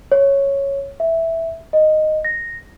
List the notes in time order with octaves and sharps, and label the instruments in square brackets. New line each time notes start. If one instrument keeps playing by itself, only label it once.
[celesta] C#5
E5
D#5
A#6